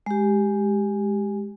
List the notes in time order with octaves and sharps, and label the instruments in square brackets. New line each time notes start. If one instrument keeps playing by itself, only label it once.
[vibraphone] G#3 G4